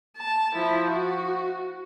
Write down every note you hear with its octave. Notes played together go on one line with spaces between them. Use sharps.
A5
F3 E4
F#4